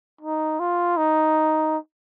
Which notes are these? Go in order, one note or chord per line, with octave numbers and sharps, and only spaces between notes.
D#4
F4
D#4